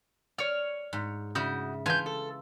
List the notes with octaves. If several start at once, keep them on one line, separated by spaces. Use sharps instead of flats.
C#5 D5 F6
G#2
C#3 E4 F#4 D#6 G6
E3 F4 G#5 A5 G6
A4